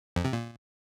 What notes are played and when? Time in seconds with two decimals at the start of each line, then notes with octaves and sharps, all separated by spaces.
0.16 F2
0.25 C3
0.33 A#2